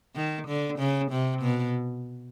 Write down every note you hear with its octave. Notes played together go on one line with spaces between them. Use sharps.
D#3
D3
C#3
C3
B2